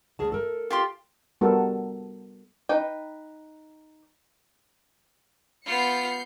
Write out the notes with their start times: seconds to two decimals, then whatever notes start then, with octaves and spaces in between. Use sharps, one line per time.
0.19 D2 G#4 A5
0.32 A4 A#4
0.70 F4 G4 C6
1.41 G3 B3 D4 F#4 A4 A#4
2.69 D#4 B4 G5
5.66 B3 F4 G6 C7 C#7